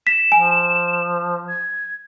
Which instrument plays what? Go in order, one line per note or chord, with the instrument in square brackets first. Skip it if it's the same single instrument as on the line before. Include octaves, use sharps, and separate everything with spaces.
[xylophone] B6 [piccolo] E7
[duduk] F3 [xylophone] G#5
[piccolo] G#6